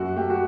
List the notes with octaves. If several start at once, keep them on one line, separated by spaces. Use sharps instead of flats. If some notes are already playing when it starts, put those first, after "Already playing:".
Already playing: F#2 F#4
A3 G4
F#4